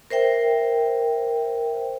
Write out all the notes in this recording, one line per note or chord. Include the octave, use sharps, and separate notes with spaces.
A#4 C5 E5 G5